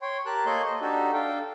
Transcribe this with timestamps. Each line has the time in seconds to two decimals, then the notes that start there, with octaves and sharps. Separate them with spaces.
0.02 C#5 G5 C6
0.26 G4 A#4 A5 F#6
0.46 A#3 A4 C#5 D#5 C6 G6
0.65 C5 D#5
0.81 D4 D#4 F#4 G4 A4
1.13 D4 A4 F5 G5